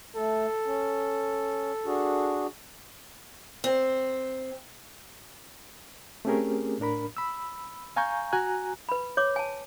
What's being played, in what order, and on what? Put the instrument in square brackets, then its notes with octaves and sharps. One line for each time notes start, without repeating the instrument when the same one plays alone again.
[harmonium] A3 [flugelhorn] A4
[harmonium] C#4
D4 F#4 G#4
[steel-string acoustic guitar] C4
[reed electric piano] A3 C4 C#4 G4 G#4 A#4
A2 D4 A#4 B5
B5 E6
F5 G#5 A#5 C#6 G6
F#4 G#5 A#5 F#6
[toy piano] B4 B5
C#5 D6
G#5 A5